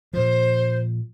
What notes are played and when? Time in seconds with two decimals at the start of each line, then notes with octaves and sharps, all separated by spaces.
0.14 A#2 F3 C5